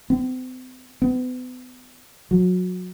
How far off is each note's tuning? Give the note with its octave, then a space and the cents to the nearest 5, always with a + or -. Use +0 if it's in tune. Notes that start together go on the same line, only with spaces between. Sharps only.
C4 -40
B3 +35
F#3 -25